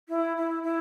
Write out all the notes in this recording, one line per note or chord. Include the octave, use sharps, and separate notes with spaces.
E4
E4
E4